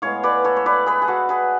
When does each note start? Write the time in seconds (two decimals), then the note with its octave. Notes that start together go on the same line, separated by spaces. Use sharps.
0.02 A2 G#3 B3 C#5 F5
0.23 B4 D5
0.44 A4 C#5
0.57 C#5
0.66 B4 D5
0.86 G#4 B4
1.02 G#4
1.08 F#4 A4
1.29 G#4 B4